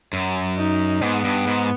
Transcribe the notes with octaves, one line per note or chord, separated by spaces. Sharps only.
F#2
D#4
G#2 B3
G2
G#2